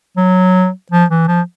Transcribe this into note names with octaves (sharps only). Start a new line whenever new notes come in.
F#3
F3
E3
F3